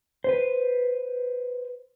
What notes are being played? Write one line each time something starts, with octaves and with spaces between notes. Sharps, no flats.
B4 C5